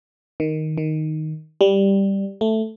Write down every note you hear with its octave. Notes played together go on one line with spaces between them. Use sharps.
D#3
D#3
G3
A3